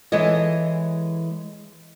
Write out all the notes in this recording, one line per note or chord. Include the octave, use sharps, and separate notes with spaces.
E3 G#3 A4 C#5 D#5